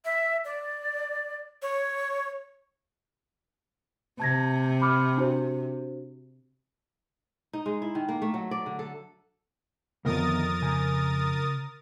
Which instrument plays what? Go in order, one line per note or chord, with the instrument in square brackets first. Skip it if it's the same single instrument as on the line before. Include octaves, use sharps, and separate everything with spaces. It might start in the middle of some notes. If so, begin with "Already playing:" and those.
[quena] E5
D5
C#5
[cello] C3 [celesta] A5 G#6 A#6
[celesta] B5 D6 F6
D4 F#4 C5
[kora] D#4
G#3
E4
D#3
A#3
A3
F#3
D5
D3
A4
[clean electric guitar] C2 F2 [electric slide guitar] D3 D#3 B3 [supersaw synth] A#4 D#6 A6
[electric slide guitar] C#3 G#5 A#5